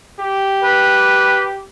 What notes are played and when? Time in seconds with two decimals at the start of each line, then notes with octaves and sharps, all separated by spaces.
0.20 G4
0.63 B4